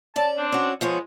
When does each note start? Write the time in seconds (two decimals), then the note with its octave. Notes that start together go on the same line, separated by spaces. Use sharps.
0.16 C#4 D5 A5
0.37 C4 D4
0.52 C#4 F#4
0.81 F3 G#3 B3 C#5